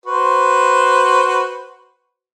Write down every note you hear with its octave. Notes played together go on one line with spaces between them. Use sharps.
F#4 B4 C5